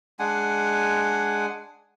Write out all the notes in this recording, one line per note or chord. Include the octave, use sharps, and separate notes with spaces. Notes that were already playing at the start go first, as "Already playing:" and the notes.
G#3 D4 F#5 G#5